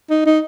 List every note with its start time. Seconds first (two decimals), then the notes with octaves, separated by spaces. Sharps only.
0.10 D#4
0.26 D#4